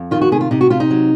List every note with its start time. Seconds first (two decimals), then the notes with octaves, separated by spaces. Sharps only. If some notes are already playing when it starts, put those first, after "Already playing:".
Already playing: F2
0.11 D#3 F4
0.21 F#4
0.32 C3 G#4
0.41 F4
0.51 C3 D#4
0.61 F#4
0.70 C3 F4
0.80 D#4
0.91 F#3